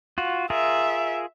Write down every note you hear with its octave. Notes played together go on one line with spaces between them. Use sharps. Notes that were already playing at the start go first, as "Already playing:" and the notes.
F4 F#4
F4 G#4 A#4 E5